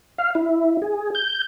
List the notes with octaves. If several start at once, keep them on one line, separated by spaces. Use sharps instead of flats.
F5
E4
G#4
G6